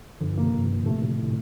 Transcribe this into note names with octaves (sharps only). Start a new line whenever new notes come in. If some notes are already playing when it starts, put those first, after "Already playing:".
G1 D3 F3
A#3
C3 D#3
G1
A#3
A#2
A2 C3 A3
A#2 A3
A2